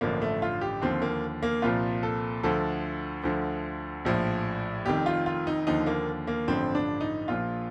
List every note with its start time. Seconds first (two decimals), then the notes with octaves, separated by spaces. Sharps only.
0.01 A1 G2 D3 F3 A#3
0.22 A3
0.42 F4
0.61 G4
0.82 D#2 D3 F3 C4
1.02 A#3
1.43 A#3
1.62 C2 A#2 F3 F4
2.03 A4
2.43 D2 D3 F3 A4
3.24 D2 D3 F3
4.05 A#1 A2 F3
4.86 F1 F2 D#3 G4
5.06 F4
5.26 F4
5.47 D#4
5.67 D#2 D3 F3 D#4
5.86 A#3
6.27 A#3
6.48 A1 G2 D3 F3 C4
6.75 D4
7.01 D#4
7.28 A#1 A#2 F3 F4